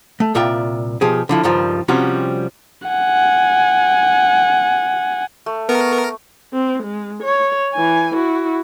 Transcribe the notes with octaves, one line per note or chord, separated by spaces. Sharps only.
A3
C2 A#2 F4 D5 E5 G5
B2 F3 G4 G#4
D3 F3 E4
C#2 G2 D#3 F3 G3
C3 F3 G3 C#4 F#4 G4
F#5 G#5
A3
B3 A#4
C4
G#3
C#5
E3 G#5
E4 F#4